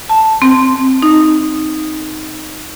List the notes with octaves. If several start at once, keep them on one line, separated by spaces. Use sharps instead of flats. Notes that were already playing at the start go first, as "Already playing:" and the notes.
A5
C4
D#4